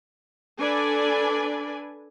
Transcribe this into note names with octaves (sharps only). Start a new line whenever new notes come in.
D4 A4 B4 D5 G#5